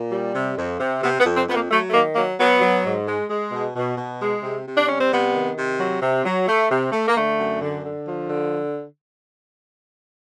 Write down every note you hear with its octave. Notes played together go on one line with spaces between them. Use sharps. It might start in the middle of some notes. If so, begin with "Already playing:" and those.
Already playing: A#2
G3
C3
F2
C3
C3 B3
B3
F2
C4
F2 B3
A#3
F#3 A3
A3
D#3 A#3
F#3 A#3
F#3 B3
F#3
G#2
G#3
G#3
B2
B2
B2
G#3
C3
C3
D4
G3 C#4
C4
C3 B3
D#3
C3
F#3
C3
F#3
A3
C3
A3
A#3
D3 A3
F#2
D3
D3
F3
D3